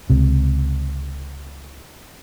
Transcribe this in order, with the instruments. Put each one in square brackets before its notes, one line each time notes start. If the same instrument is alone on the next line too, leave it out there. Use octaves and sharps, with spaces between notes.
[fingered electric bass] C#2 C3